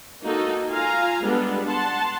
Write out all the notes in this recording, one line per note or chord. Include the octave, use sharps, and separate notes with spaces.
A#3 D#4 F#4 A4
F4 F5 G#5 A#5
G3 G#3 B3 D4 A4
F#5 A5 C6